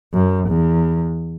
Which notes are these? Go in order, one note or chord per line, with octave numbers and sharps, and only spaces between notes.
F#2
E2